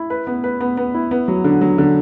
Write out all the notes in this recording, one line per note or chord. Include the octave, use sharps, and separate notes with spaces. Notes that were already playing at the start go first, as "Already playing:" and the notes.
Already playing: E4
B4
B3
B4
B3
B3
E4
B3
F#3
D3
F#3
D3